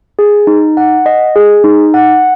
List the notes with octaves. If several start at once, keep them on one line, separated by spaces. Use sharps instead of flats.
G#4
D#4
F#5
D#5
G#4
D#4
F#5